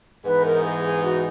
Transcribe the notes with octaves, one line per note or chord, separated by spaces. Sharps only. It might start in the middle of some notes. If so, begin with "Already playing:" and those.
G#2 E3 B3 D#4 B4
A#4
G#4
G#4
F#4